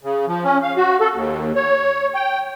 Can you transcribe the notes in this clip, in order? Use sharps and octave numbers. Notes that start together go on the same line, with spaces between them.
C#3
F3
C#4
F5
F#4
A4
D#2
C#5
G5